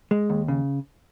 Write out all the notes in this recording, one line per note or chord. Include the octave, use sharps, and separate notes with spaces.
G#3
D#2
C#3